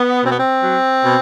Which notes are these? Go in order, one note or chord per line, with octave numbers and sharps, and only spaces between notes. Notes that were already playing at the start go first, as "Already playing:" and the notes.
Already playing: B3
B2 C4
B3
C4
F#3
B2